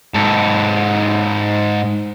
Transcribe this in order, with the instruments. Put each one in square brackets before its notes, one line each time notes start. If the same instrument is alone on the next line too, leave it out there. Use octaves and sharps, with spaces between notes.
[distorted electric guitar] G#2 A4